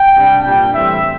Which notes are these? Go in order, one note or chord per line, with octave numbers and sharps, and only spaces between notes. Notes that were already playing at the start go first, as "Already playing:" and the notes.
Already playing: G5
C3 G3 D4
A#2 G3 D4 G5
A2 E3 G3 C4 E5